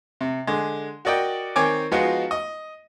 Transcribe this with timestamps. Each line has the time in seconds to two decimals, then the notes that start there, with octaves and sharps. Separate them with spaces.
0.21 C3
0.47 D3 G#3
1.05 F#4 A#4 D5 D#5 G5
1.56 D#3 C4 C#5 G#5 D6
1.91 F3 G#3 B3 D#4 F4 F#4
2.31 D#5